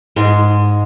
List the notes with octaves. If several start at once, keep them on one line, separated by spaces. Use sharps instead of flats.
G#2 G#3